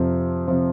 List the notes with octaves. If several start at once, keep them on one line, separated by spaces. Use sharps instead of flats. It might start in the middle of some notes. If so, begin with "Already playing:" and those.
Already playing: F2 C3 F3
C3 F3